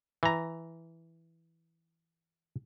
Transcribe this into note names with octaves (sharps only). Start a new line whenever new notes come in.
E3 A#5